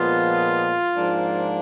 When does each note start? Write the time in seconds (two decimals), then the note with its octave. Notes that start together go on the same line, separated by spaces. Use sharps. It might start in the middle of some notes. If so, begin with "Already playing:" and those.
Already playing: A#2 F3 G#3 B3 F4
0.95 G#2 F3 A#3 D4